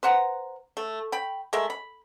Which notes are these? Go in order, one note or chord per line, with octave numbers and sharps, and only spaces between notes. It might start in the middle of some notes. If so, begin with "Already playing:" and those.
B4 C5 F#5 A#5
A3
G5 B5
G#3 A3 A#4 E5
B5